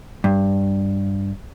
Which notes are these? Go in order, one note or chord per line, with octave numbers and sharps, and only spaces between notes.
G2